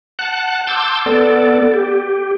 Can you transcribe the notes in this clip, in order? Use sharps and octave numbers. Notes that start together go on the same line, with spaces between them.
F#5 A5 F#6
A5 C6 D6 E6 G6
B3 A4 D5
G4